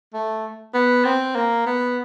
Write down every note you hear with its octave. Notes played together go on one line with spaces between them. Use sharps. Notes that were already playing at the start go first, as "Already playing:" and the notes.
A3
B3
C4
A#3
B3